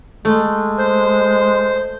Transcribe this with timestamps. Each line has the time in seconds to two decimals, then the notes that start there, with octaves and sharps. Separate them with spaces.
0.25 G#3 A3
0.78 C5